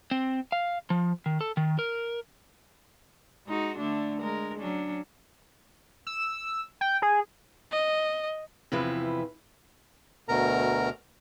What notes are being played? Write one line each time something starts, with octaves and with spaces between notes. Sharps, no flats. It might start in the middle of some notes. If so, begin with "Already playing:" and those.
C4
F5
F3
D#3
A4
D#3
A#4
G#3 D#4 F#4
D3 A3 D4
G#3 A#4
F#3 C#4 D4
E6
G5
G#4
D#5
E2 C3 F3 E4 B4
D2 B2 A#4 A#5